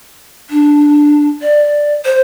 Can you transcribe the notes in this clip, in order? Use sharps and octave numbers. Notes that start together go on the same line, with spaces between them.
D4
D5
C5